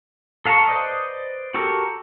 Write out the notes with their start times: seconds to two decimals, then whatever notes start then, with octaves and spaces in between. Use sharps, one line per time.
0.45 A4 F5 A5 A#5 C#6
0.68 B4 C5 D5 D#5
1.54 F#4 G4 A4 A#4